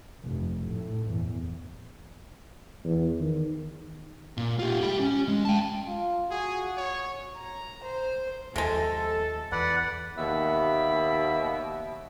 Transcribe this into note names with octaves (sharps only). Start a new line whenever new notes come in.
F1
A2
E2
E2
D#3
A#2
F4 G4
G4 B5
C#4
G#3
G5 A5
F4
F#4 G#4
C#5
A#5
C5
D#2 C3 F3 G#3 A4
E2 B4 D5 F#5
D#2 B2 E5 B5